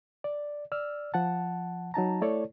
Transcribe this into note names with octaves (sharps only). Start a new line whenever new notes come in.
D5
D5 E6 F6
F3 F#5 A5
F#3 D#4 A5 A#5
A3 E4 A4 C#5 D5